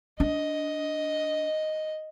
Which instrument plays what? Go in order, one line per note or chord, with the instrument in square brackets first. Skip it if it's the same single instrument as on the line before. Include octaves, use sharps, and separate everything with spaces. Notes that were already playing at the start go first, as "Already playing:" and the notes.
[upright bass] D4 [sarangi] D#5